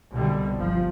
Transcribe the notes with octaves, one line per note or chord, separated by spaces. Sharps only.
C2 B2 D3 G3
G1 F3